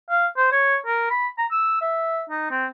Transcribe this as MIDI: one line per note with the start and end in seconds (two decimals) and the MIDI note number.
0.11 0.27 77
0.37 0.52 72
0.52 0.77 73
0.86 1.09 70
1.11 1.28 83
1.38 1.47 82
1.52 1.78 88
1.82 2.24 76
2.30 2.47 63
2.51 2.66 60